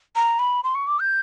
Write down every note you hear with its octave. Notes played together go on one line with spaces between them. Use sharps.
A#5
B5
C6
C#6
D6
G6